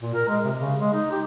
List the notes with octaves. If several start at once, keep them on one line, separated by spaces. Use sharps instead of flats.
A#2
A#4
G#3
C3
C#3
G#3
D#4
G4